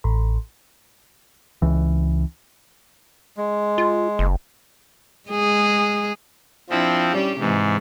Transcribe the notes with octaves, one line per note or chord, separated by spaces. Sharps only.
A1
C#2 E3
G#3
F4
F#1
G#3 G#4
F3 C4 D4 E4
G3 C#4 G4
G#2 C3 E3